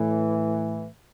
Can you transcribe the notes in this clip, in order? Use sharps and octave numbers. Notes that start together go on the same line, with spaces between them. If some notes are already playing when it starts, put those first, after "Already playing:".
Already playing: A2 E3